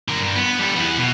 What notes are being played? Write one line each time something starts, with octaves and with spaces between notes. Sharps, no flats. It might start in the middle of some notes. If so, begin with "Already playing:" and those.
D3 A#4
G2
B3
G3 A4
E2 B3
B2